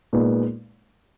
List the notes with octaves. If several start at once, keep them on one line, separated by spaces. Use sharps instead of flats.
A#2 G#3 B3 D#4